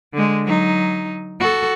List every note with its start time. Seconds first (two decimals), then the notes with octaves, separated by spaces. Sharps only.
0.14 D3 G#3
0.46 F#3 D#4
1.40 F#4 A4